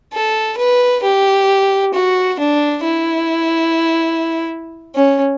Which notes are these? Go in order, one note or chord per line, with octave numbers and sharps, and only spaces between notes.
A4
B4
G4
F#4
D4
E4
C#4